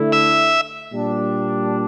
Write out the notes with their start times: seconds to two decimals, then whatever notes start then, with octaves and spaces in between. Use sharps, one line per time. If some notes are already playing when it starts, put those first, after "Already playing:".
Already playing: D3 A3 E4
0.12 E5
0.93 A#2 G3 D4